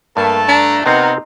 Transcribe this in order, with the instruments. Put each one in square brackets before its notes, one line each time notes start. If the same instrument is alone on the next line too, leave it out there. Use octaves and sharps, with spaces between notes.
[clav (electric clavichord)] G2 [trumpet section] A3 A5 [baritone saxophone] A#3
[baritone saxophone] D4 [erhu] A#5
[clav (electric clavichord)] C3 C4 [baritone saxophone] B3 [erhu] D#4 [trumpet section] A#4 F#5